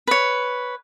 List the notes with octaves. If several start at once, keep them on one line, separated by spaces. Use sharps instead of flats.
B4 C#5